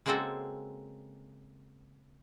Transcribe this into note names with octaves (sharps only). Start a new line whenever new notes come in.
C#3 G#3 A#3 C4 F#4 A4